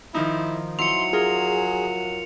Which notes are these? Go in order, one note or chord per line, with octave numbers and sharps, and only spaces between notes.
D#3 F3 D#4 E4
F#3 E4 C6 C#7 F7
F4 G#4 A#4